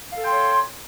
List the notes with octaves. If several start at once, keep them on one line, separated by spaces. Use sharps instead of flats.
A4 C#5 F5 G5 C6